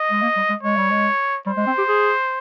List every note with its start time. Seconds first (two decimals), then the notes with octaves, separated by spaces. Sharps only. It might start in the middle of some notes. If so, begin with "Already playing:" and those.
Already playing: D#5
0.11 G#3
0.23 A#3
0.36 G3
0.50 G#3
0.63 G#3 C#5
0.77 G3
0.91 G#3
1.46 G3 C5
1.57 G#3
1.67 C4
1.78 G4
1.88 G#4